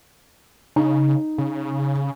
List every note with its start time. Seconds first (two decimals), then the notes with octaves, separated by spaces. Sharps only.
0.76 C#3 D#4
1.38 C#3